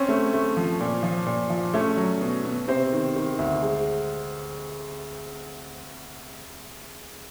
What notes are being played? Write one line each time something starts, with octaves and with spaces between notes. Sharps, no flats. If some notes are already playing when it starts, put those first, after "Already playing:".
Already playing: C4 C#4 C#5
A3
A3
F3
A#2
F3
A#2
F3
A3 C#4 C#5
F#3
B2
B2
C3 C4 C5
D#3
D#3
D2
G#3